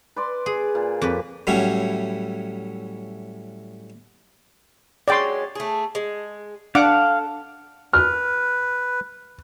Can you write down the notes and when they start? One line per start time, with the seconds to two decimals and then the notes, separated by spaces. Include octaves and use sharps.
0.16 B4 D5 C6
0.46 G#4
0.75 A#2
1.02 F2 G4 B4
1.47 A2 F#3 G3 C#4 E4
5.08 F#3 G#3 C#4 D5 G5 C6
5.55 A3 G#4
5.95 G#3
6.75 D4 A4 F5 F#5 D6
7.93 B4 F6